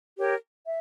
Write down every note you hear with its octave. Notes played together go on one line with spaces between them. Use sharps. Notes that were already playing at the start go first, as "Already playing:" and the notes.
G4 A#4 C#5
E5